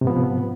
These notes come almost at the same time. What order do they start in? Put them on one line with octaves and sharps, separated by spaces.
C3 G#2 B3 F3